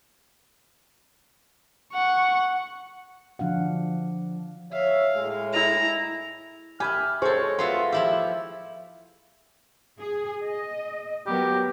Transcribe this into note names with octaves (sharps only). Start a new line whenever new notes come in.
F#5 C#6
D3 F3 D4 F5 F#5
C#5 E5 F5
A2 G#3
E4 A#5
G4 E5 G#5 B5 F6
G#3 G#4 A4 C5 C#5 C#6
B3 F4 F#4 E5 C6
F3 E4 G4 E5
G#4
D#5
F#3 B3 G4 A#4